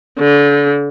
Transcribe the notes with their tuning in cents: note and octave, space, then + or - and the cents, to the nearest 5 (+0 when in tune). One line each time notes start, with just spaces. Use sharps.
D3 -30